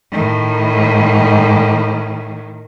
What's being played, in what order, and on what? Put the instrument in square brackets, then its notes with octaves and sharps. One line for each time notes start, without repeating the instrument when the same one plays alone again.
[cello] A2 D#3